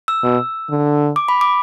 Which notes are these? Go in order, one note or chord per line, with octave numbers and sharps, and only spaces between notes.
E6
B2
D3
D6
B5
D6